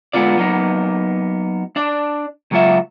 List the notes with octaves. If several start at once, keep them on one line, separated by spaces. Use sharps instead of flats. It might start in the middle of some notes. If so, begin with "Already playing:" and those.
D3 G#3 B3 C#4 F4 D5
F#3 A#3 B3 D#4
D4 D5
C#2 F#3 A#3 F4 F#4 E5